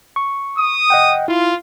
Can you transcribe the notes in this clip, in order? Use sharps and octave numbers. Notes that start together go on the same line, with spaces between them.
C#6
D#6
D#5 F#5 G5
E4 F4